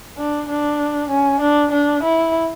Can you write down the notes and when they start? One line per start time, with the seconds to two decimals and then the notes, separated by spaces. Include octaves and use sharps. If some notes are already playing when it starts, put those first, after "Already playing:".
0.17 D4
0.49 D4
1.10 C#4
1.41 D4
1.72 D4
2.03 E4